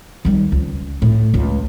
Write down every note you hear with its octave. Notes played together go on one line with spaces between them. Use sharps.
D#3 G3
C#2
A2
C#2